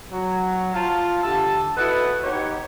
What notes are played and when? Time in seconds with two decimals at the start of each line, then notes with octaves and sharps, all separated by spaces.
0.12 F#3
0.73 F4 A5
1.23 D3 G4 E5 A5
1.77 E4 F#4 A4 B4 D#5 F#5
2.23 B3 D#4 G4 C#5